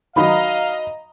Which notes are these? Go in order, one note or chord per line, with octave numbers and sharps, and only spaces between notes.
D#3 F#3 D#5 F5 A#5 B5